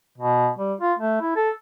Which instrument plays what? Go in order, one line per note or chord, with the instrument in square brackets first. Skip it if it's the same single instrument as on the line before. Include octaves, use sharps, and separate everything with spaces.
[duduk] B2
G3
F4
A3
E4
A4